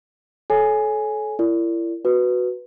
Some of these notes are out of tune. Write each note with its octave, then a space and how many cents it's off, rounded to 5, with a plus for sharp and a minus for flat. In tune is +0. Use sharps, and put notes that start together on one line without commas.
A4 -30 C#5 +0 G#5 +0
E4 +35 A#4 -30 D5 -25
F#4 +0 B4 +0